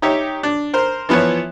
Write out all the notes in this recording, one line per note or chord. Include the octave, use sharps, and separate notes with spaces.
D#4 G4 C#5 E5
D4
A#4 C5
E3 F3 B3 E4 C#5